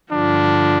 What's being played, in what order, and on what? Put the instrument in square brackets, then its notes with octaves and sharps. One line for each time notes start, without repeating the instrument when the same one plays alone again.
[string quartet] G2 D3 F3 [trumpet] D4